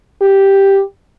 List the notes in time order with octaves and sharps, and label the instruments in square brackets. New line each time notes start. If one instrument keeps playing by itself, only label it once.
[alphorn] G4